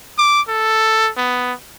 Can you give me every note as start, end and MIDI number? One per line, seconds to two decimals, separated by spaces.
0.18 0.42 86
0.49 1.11 69
1.17 1.53 59